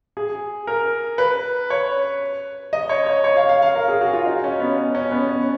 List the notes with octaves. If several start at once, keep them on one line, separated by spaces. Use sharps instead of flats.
G#4
A#4
B4
C#5
D#5
C#5
C#5
C#5
F5
F5
F5
A#4
G#4
F#4
F4
D#4
C#4
B3
C#4
C#4
B3
C#4